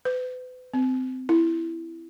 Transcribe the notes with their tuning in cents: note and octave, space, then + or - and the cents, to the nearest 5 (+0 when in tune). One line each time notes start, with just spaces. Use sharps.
B4 +40
C4 -20
E4 +10